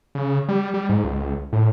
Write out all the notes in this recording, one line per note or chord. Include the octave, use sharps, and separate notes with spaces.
C#3
G3
G3
G#2
C#2
A2